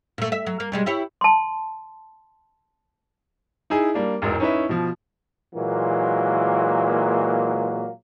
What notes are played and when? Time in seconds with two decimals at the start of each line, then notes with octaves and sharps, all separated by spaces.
0.18 A#2 A3
0.32 E5
0.47 F#3
0.60 A#3
0.72 B2 G3 G#3
0.86 E4 G4 C#5
1.21 A5 C6
3.70 D#4 E4 G#4
3.94 G3 A#3 D4
4.22 E1 A1 G#2 G#3 A#4
4.40 C#4 D#4 E4 B4 E5
4.69 B2 F3
5.54 A#2 E3 F#3 G#3 A#3